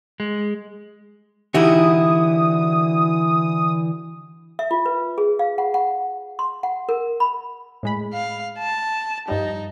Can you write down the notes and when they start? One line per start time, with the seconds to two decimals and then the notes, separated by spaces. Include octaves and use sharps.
0.20 G#3
1.54 D3 E3 D#4 E4 F#4 G4 D#6
4.59 E5
4.71 F4
4.86 B4
5.18 G#4
5.39 F5
5.58 F#5
5.74 F#5
6.39 C6
6.63 F#5
6.89 A#4
7.20 B5
7.83 A2 G#3 B5
8.14 F5
8.59 A5
9.28 G2 F3 G3 D#4